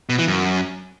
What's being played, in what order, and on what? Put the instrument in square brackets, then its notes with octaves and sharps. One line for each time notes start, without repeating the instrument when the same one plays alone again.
[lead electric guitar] B2
E3
F#2